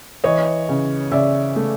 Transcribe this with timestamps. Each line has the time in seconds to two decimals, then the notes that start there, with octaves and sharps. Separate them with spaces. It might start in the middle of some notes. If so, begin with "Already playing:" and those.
0.24 E3 C#5 D#5
0.69 C#3
1.12 C#3 D5 E5
1.56 A3